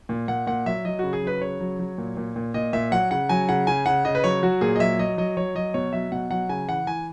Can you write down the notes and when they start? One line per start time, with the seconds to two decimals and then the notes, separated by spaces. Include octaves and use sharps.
0.09 A#2
0.28 A#2 F#5
0.47 A#2 F#5
0.66 F#3 E5
0.85 F#3 D#5
0.99 C#3 F#4
1.13 G#4
1.23 F#3 B4
1.41 C#3 C#5
1.60 F#3
1.79 F#3
1.98 A#2
2.17 A#2
2.36 A#2
2.54 A#2 D#5
2.73 A#2 E5
2.91 F#3 F#5
3.11 C#3 F#5
3.29 F#3 G#5
3.49 C#3 F#5
3.67 C#3 G#5
3.86 C#3 F#5
4.05 C#3 D#5
4.15 B4
4.24 F#3 C#5
4.43 F#3 F#4
4.61 A#2 G#4
4.76 D#5
4.80 F#3 E5
4.99 F#3 D#5
5.18 F#3 D#5
5.37 F#3 C#5
5.55 F#3 D#5
5.74 B2 C#5
5.93 F#3 E5
6.12 B2 F#5
6.31 F#3 F#5
6.49 C#3 G#5
6.69 E3 F#5
6.87 E3 G#5